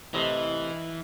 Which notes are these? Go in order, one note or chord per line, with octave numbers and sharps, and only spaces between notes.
A2 C3 E3 D#5 F5